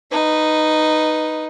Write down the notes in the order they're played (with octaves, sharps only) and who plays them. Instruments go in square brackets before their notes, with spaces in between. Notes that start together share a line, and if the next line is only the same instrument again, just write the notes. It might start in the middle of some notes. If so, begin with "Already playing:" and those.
[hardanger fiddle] D#4 B4